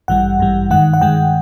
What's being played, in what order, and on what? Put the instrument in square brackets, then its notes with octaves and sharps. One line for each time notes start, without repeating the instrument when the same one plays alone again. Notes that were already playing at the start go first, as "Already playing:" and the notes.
[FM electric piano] A1 G2 E3 G3 F#5
A1 G2 E3 G3
G2 D#3 G#3 F#5
F#5
G2 D#3 G#3 G5